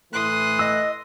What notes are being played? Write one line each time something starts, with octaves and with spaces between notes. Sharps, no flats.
A2 E3 A3 C6 D#6 F#6
D#5 E6